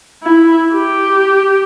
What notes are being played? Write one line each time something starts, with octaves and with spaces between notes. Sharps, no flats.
E4
G4